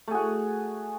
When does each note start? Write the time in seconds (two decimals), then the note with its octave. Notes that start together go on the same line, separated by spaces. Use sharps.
0.08 A3
0.11 G#4
0.14 F#4